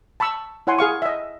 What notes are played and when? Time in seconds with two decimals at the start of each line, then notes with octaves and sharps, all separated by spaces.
0.20 A5 B5 C#6 E6
0.67 E4 C#5 F#5 G#5 C6
0.79 G#4 F5 C#6
1.02 D#5 E5